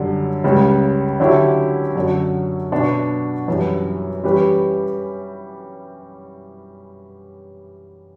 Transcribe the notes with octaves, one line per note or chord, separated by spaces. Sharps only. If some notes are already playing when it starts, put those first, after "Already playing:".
Already playing: F#2 D3 G3
C#2 C#3 G3
D3 F#3 C#4 E4 G4
F#2 D3 F#3
B2 F#3 B3 D4 F#4
F#2 E3 G3
E3 G3 C#4 G4 B4